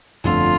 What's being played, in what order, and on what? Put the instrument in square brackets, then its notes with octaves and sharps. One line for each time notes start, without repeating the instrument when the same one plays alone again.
[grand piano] G1 F2 D3 A3 [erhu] F4